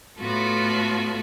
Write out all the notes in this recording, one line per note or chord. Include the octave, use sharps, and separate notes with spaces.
A2 A3 B3 F4 F#4 A4